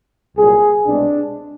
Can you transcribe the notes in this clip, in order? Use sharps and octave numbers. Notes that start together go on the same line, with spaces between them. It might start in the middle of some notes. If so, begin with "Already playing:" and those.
C2 A#2 F#3 G#4
C2 B2 G#3 C4 D4